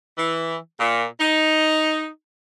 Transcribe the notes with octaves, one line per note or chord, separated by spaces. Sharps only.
E3
A#2
D#4